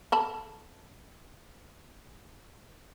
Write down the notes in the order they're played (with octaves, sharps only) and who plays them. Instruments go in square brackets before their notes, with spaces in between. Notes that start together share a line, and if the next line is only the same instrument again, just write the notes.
[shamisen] A4 A5 B5